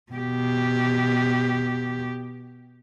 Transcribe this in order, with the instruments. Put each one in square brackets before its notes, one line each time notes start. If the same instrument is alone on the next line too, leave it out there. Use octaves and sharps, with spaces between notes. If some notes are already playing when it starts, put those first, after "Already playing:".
[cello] B2 G4